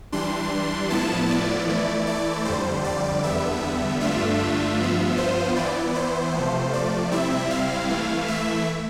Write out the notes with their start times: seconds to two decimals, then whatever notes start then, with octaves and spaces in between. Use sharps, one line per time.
0.12 E3 G3 D4 C6
0.90 A2 F3 B3 E4 A5
1.29 D5
1.68 E3 A3 E4
2.07 D5
2.45 F2 D3 G3 C5
2.84 D5
3.23 E2 D3 G3 B3 E5
4.01 G2 D3 A3 D4 F4 E5
4.79 G2 F3 B3 F4
5.17 C5
5.56 E3 B3 E4 D5
5.95 C5
6.34 C3 F3 A3
6.73 D5
7.11 C3 G3 C4 E4 E5
7.50 F5
7.89 E3 A3 E4
8.28 E5